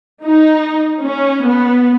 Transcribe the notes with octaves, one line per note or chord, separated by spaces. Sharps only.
D#4
C#4
B3